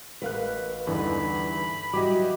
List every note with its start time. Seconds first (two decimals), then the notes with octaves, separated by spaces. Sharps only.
0.22 A1 A#4 B4 F5 F#6
0.87 E2 G2 D3 E3 D#4 B5
1.93 E3 F#3 G3 D#5 G5 D6